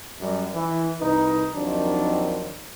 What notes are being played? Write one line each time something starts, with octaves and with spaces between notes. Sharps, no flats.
F#2 G3
E3 E4
C2 D#4 B4
D#2 D#3 F3 F#3 C4 D4